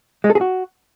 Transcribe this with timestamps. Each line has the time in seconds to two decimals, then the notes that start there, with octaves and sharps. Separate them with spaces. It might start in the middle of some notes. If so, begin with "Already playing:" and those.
0.24 G#3
0.30 A4
0.35 G#4
0.41 F#4